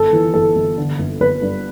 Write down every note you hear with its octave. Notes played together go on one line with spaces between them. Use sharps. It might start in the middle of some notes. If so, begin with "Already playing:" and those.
Already playing: G1 A4
E3
G1 A4
G1
D3
G1
G1 B4
G2